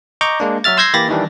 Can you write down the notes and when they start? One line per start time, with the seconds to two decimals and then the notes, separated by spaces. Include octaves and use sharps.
0.21 D#5 A#5 C#6 D6 G6
0.40 G#3 A#3 D4
0.64 F#3 F#4 E5 F6 A6
0.77 C6 E6 G6 G#6 A#6 C7
0.94 E3 A#3 G4 B5 A6 A#6
1.09 D#3 E3 G3 D4